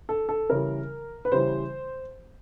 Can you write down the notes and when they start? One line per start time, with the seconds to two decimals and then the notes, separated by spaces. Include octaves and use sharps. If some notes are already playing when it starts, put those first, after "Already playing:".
0.09 A4
0.29 A4
0.50 C#3 E3 G3 A#4
1.25 B4
1.32 C#3 E3 G3 C5